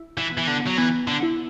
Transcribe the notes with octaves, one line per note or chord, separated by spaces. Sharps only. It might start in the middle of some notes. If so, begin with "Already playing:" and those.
Already playing: E4
E3
B3
E3
D3
F#3
E3 B3
D3
E4